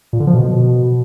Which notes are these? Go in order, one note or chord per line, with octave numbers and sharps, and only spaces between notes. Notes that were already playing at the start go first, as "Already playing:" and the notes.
A#2
D3
F3
B2